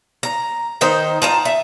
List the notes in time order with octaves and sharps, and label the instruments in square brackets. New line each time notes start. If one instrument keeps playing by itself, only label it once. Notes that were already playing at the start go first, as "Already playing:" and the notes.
[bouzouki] A#5
D#3 D#4 C5
F4 A5 A#5
E5